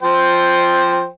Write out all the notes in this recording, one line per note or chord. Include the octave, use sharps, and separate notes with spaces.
F3 C5 G5